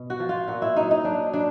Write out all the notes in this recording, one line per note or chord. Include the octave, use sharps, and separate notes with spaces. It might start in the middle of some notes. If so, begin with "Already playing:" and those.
Already playing: B2
F#4
F3
F4
A#2 F#4
E4
F#3 D#4
D#4
F#3 D4
F#3 D4